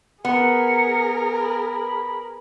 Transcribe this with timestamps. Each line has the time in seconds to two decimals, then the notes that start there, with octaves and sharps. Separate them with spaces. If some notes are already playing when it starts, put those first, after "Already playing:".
0.25 B3 G#4 A#4 C#7
1.41 B5